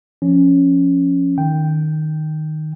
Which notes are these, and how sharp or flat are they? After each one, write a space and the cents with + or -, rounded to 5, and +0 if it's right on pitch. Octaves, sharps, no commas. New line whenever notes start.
F3 +0 C#4 +0
D#3 -10 G5 +0